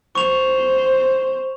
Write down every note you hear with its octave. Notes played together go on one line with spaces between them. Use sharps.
C5 C#6 F7